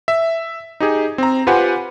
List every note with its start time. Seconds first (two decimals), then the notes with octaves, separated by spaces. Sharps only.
0.08 E5
0.80 D#4 G4 G#4
1.18 C4 A#5
1.47 F4 G4 B4 C5 F#5 G#5